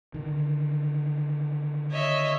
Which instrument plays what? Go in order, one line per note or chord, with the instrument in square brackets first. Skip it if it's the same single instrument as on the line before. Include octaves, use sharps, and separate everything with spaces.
[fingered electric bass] D3 D#3
[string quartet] C#5 D#5 E5